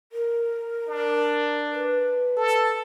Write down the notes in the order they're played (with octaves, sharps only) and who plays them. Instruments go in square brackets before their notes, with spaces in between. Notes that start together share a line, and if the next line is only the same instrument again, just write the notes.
[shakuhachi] A#4
[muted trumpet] D4
[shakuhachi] B4
[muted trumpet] A4